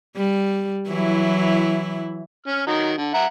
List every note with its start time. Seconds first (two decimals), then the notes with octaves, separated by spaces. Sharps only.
0.17 G3
0.88 E3 F#3 E4
2.47 C#4 F6
2.67 D#3 F#3 D#4
2.97 D3
3.14 E5 F#5 A#5